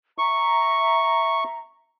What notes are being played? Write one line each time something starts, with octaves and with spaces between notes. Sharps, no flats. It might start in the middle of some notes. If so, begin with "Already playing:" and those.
E5 A#5 C#6